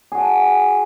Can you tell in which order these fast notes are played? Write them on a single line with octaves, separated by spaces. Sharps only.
G#4 F#4 G#5 A5